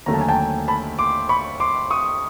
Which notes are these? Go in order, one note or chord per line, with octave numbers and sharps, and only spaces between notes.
D#2 D3 F#3 A3 A#5
A5
G#5
G5 A5
A5 B5
C6 D6
B5 C#6
C6 D6
C#6 D#6